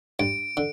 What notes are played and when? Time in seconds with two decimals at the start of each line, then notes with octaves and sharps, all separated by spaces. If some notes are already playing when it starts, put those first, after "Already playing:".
0.19 G2 D7
0.57 D3